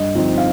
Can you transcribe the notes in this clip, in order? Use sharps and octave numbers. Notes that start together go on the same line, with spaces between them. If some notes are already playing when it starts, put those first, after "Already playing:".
Already playing: G2 D#5
D3 F3 C4 D#4
F5